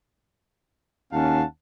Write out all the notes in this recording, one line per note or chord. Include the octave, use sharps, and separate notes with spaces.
D#2 C#4 F5 F#5 A5